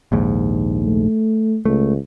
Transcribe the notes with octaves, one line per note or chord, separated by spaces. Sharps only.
A#1 D#2 G#2
A3
C#2 A3